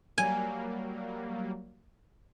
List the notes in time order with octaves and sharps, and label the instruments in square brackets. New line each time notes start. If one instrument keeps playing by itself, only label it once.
[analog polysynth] F#3 G3 A#3 [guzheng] G#5